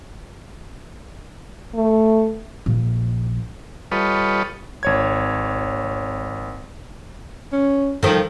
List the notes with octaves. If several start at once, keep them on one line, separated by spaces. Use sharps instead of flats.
A3
A#1
G3 F4 A4 B4 C#5 D#5
G#1 C#5 G#6
C#4
D#3 F3 A4